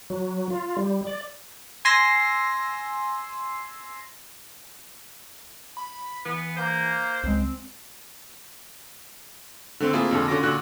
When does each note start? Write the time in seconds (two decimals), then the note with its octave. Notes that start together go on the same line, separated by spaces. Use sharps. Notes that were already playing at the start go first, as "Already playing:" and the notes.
0.10 F#3
0.50 F4
0.77 G3
1.07 D5
1.85 G#5 C6 E6 A#6 C7
5.77 B5
6.25 E3 B3
6.57 A#3 C5
7.24 C#2 G#3 C4
9.80 D3 A3 C4
9.93 A#3 C4 E4 F4 G#4
10.11 F2 A#2 D3 A5
10.28 D3 C#4 F4 F#4 D6 A#6
10.43 A#2 D3 F#4 F#6